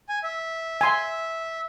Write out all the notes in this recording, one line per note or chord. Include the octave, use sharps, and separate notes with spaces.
G#5
E5
G#5 C6